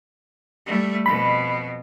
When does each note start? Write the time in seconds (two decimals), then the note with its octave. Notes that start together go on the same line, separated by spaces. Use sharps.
0.66 G3 A3
1.06 F2 B2 B5